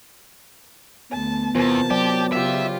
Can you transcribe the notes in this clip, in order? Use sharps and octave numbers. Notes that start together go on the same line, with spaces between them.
D2 B3 A5
E2 C3 F4 A#4 C5 A5
F#3 G4 C5 D5
C#3 F4 G4 E5